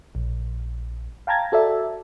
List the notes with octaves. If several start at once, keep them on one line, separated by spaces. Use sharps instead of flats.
A#1
F5 G5 A5 A#5 G#6 A6
F#4 A4 D5 E5